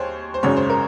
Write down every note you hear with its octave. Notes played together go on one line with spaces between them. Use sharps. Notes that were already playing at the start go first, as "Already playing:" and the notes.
Already playing: D#2 G#4 C5 C#5
C5
G#1 F#2 C#3 C#5
C5
A#4